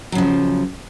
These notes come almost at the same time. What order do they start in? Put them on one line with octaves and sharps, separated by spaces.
F#3 C#3 F3